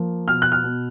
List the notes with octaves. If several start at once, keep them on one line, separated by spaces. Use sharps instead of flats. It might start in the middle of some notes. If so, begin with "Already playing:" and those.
Already playing: F3 A#3
B2 F6
F#6
F6
B2